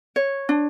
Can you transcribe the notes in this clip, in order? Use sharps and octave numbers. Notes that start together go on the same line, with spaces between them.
C#5
D4